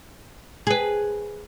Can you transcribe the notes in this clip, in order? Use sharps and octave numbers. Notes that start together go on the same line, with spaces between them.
G#4 B4